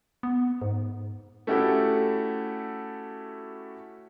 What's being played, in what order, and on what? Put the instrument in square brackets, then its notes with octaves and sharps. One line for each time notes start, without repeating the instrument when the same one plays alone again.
[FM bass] B3
G#2
[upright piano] A3 C#4 E4 F#4 G4 A4